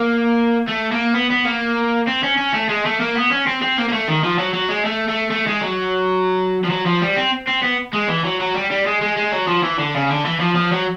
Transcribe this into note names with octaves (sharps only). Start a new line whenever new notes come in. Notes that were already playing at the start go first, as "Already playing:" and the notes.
Already playing: A#3
A3
A#3
B3
B3
A#3
C4
C#4
C#4
A3
G#3
A3
A#3
B3
C#4
C4
C4
A#3
A#3
A3
D#3
F3
F#3
F#3
G#3
A3
A3
A3
G#3
F#3
F3
F#3
F3
G3
C4
C4
B3
G#3
E3
F#3
F#3
G3
G3
G#3
G#3
G#3
F#3
F3
E3
D3
C#3
D3
E3
F3
F3
F#3